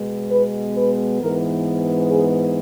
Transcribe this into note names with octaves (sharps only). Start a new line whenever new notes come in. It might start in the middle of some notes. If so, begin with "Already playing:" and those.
Already playing: B2 G#3 B3
B4
B4
G#2 E3 B3 A#4
G#4